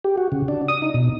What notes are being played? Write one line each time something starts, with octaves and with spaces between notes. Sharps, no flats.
G4
F#4
C#3
D4
D#6
D#4
B2